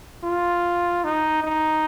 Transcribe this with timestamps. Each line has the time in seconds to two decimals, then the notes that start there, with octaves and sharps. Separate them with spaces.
0.23 F4
1.04 D#4
1.44 D#4